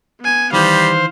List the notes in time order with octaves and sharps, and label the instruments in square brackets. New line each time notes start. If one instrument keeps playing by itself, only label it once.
[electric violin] B3 G#5
[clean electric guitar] D#3 E3 [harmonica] G3 [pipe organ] C5 [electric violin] F5